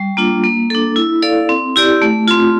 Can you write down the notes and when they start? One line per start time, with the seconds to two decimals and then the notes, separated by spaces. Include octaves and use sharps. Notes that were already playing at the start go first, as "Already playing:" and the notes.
Already playing: G3
0.17 A#3 D4 F4
0.44 A#3
0.70 D4 A4
0.96 E4
1.22 A4 D5 F5
1.49 C4
1.76 E4 G4 D5
2.02 A3
2.28 C4 F4